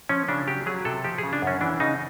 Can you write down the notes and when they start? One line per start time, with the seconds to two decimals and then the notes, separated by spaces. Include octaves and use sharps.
0.09 F3 C#4
0.28 C#3 D4
0.47 F#3 G4
0.66 F#3 G#4
0.85 C3 A4
1.04 F3 G4
1.18 G#4
1.23 C#3
1.33 D4
1.42 F#2 C#4
1.61 E3 D4
1.80 C#3 D#4